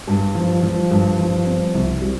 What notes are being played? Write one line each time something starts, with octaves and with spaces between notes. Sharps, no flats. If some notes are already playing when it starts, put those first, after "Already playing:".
G2
F3
F3
G2
F3
C4
C2
G3